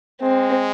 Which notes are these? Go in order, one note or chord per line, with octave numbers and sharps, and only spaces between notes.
G#3 C4